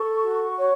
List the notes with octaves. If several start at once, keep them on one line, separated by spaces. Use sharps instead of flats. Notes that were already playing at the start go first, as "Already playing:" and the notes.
Already playing: A4 C#6
F#4
C#5